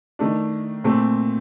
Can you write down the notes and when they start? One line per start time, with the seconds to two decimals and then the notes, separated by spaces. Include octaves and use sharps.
0.19 D#3 A3 D4
0.84 A#2 A3 C4